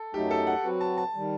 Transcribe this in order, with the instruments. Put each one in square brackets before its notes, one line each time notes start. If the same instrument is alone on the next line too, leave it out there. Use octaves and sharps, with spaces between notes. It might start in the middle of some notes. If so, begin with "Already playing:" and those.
Already playing: [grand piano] A4
[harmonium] F#2 F#3 A3 D#4 [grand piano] G4
[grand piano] A4
F#5
[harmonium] F#3 C4 F#4 B4
[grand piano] A5
A5
[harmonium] D#3 G3